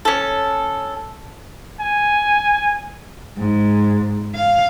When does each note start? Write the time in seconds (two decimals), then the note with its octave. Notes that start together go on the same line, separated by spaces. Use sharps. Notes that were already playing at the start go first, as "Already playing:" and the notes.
0.05 C#4 A4
1.80 G#5
3.37 G#2
4.35 F5